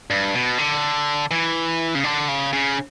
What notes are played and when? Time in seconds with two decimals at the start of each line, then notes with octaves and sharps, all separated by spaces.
0.10 G2
0.35 B2
0.58 D3
1.31 E3
1.95 C#3
2.04 D3
2.28 C#3
2.53 C#3